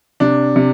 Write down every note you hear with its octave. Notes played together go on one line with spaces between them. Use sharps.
C3 D4
C3